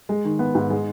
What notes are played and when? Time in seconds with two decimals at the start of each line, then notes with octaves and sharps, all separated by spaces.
0.09 G#3
0.25 D#3
0.39 B3
0.55 G#2
0.70 G#3